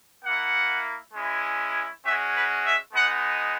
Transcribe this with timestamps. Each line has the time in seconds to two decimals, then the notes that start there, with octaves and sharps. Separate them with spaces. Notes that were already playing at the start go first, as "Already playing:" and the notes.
0.24 A#3 E4 F#5
1.14 G#3 C#4 E4
2.04 G#3 C#4 F#4 E5
2.33 B4
2.64 E5
2.93 G#3 B3 D#4 F#5